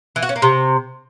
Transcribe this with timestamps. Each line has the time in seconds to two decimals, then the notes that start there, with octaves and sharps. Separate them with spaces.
0.16 E3
0.22 F#4
0.29 C#4
0.36 A#3
0.42 C3